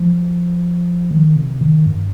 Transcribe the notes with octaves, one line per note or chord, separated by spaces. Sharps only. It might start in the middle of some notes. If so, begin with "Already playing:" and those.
Already playing: F3
D#3
C3
D#3
G2